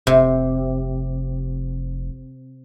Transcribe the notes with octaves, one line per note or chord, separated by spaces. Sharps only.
F1 C3